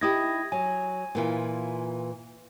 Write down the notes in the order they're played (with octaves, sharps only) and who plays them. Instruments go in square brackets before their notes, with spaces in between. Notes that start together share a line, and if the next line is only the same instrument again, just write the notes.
[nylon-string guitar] D#4 E4 G4 [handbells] D#6 G#6 A#6
[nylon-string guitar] F#3 [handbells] G#5
[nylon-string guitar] A#2 E3 F4